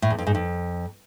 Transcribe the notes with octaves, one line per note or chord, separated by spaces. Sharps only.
A2
E2
F2
G#2
F2